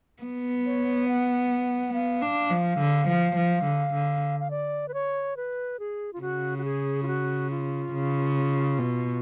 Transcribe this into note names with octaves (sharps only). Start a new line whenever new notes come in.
B3
C#5
F#5
B3 F5
D4
F3
D3
F3
F3
D3
D3
F5
D5
B4
C#5
B4
G#4
F4
C#3 F#4
F#4
G#4
F4
F#4
F4
C#3
B2